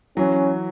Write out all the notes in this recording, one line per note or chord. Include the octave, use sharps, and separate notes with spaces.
E3 F#3 C#4